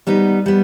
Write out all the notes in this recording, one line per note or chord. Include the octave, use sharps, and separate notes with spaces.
G3 B3 D#4
G3 B3